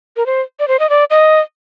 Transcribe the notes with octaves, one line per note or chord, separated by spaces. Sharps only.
A#4
C5
D5
C5
D#5
D5
D#5